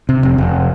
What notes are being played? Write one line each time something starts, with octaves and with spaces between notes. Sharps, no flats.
C3
F1
F1